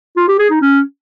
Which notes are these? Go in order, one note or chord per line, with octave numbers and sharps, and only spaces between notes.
F4
G4
G#4
D#4
C#4